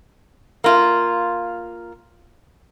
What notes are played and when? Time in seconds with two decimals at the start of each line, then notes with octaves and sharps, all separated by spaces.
0.64 A#3 F4